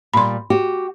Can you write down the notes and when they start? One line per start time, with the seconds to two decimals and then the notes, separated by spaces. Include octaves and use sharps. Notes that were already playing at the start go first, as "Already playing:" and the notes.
0.14 A#2 G3 B5 C6
0.50 F#4 G4